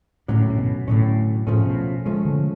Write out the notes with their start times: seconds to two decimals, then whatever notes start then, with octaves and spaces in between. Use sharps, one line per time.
0.28 A2 D3 F#3 C#4
0.50 A2
0.58 B2
0.88 A2 D3 F#3 C#4
1.47 A2 C#3 F3 A3 C#4
1.66 B2
2.06 C#3 F3 G#3 A3 C#4
2.25 D3